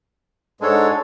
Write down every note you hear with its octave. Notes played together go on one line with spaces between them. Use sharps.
G#2 G#3 D4 A4 C#5